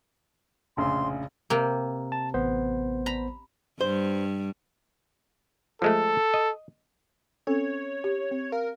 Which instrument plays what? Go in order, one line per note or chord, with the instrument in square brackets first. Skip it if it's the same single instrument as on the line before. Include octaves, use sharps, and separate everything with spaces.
[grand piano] F1 A#1 C#3 [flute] C6
[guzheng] C3 A#3
[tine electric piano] A5
A1 B3 C5
[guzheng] A#5 B5
[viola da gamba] G2 G3 [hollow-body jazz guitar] C5
[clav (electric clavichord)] F3 G#3 A3 [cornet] A4
[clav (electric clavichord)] D#5
[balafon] C4 C#4 A4 [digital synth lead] C#5
[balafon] G4
C4
[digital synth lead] A#4 [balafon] F5